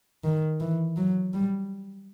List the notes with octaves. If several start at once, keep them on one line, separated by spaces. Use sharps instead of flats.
D#3
E3
F#3
G3